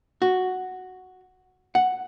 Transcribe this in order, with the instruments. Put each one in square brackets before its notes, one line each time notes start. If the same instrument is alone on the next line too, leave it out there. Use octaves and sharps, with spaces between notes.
[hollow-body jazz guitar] F#4
F#5